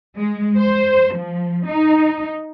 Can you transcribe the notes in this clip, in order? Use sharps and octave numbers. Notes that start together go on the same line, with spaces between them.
G#3
C5
F3
D#4